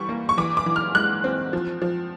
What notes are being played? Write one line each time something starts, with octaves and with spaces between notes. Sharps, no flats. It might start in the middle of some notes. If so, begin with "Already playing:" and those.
Already playing: E3 G3 C#6
A#3
C#6
E3 D6
D6
E3
F6
G#3 F#6
C4
F3
F3